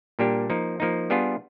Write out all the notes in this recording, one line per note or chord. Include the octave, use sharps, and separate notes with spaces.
A#2 G3 A#3 D4 G4
F3 A#3 D#4
F3 A#3 D#4
G3 B3 D4 F4 G#4